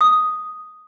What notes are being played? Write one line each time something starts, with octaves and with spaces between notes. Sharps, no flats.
D#6